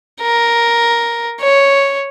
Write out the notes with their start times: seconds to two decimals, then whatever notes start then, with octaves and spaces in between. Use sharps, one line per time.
0.21 A#4
1.41 C#5